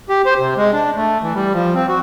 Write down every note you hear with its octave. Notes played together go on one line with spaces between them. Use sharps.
G4
C5
C3
G#3
D4
A3
E3
G3
F3
C4
F#4